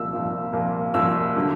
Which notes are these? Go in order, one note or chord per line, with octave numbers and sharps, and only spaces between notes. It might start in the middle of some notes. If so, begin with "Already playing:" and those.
Already playing: C2 A#2 F3 A#3 E6
C2 A#2 F3 A#3
C2 A#2 F3 A#3
C2 A#2 F3 A#3 E6
D3 F#3